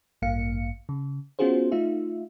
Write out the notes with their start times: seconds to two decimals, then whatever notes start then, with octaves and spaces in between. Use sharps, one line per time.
0.22 A1 G2 A#3 F5 C#7
0.89 C#3
1.39 B3 C#4 F4 F#4 G#4 C5
1.72 A3 D#4 F4 E5